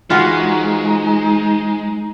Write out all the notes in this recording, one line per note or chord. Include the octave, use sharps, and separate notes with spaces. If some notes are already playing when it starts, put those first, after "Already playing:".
E3 F3 G#3 D#4 F4 F#4